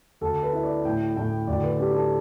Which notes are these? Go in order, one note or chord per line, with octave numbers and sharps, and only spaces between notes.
D2 A4
B4
E4
D5
A2 G5
A2 G5
D2 D5
B4
D4 G4
A4